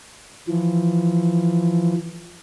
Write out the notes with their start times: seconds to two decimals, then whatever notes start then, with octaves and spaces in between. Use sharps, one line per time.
0.48 E3 F3